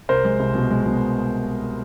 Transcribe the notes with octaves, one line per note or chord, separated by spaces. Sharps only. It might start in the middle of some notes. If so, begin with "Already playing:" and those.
C2 A#4 C5
G#3
C2
B2
G#3
B2